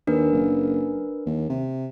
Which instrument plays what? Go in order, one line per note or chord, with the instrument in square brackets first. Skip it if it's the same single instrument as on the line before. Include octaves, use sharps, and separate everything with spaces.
[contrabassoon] D#2 [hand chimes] D4 A#4 B4
[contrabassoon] F#1
D#2
C3